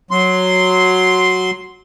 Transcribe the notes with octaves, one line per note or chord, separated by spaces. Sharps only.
F#3 C6